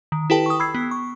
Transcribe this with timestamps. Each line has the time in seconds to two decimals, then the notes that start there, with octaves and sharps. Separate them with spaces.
0.12 D#3
0.30 E4 G4 A4 B4 G5 A5
0.46 C#6 D#6
0.60 B5 E6 G#6 C7
0.75 B3
0.91 C#6